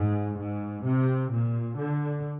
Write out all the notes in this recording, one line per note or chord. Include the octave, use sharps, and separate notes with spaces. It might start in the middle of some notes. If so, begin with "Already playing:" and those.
Already playing: G#2
G#2
C3
A#2
D3